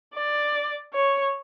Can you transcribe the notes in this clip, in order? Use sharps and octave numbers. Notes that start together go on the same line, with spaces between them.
D5
C#5